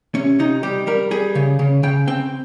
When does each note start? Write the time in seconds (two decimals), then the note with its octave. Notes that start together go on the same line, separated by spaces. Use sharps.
0.15 C3 C#4
0.39 C3 D#4
0.63 G3 G4
0.87 G3 A#4
1.11 G3 G#4
1.35 C#3
1.59 C#3
1.83 C#3 G5
2.07 C4 G5